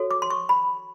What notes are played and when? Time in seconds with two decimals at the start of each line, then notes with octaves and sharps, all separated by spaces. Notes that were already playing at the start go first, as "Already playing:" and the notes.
Already playing: F#4 A4 C#5
0.11 D6
0.22 C6
0.30 C#6
0.49 B5